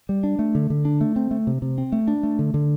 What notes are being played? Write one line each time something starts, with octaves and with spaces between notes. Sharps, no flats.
G3
D4
A3
D3
D3
D4
A3
C4
A3
C3
C3
C4
A3
D4
A3
D3
D3